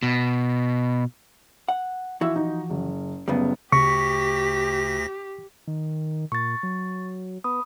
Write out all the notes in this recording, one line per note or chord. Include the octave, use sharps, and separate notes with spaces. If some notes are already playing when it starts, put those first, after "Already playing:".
B2
F#5
E3 F3 E4 F#4 E5 E6
D#4
F#1
F#1 A2 C#3 G3 B3
D2 C#3 G4 C#6 A#6 B6
D#3
A#2 C#6 A6
F#3
B3 B5 D#6